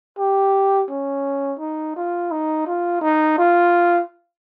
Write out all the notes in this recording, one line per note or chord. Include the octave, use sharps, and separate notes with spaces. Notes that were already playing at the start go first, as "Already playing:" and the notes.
G4
C#4
D#4
F4
D#4
F4
D#4
F4